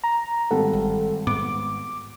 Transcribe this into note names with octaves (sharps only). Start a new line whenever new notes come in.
A#5
G#1 G3 A4 F#5
G1
G#2 B3 D6